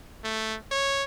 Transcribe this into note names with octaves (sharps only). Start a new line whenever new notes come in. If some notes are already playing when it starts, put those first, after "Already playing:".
A3
C#5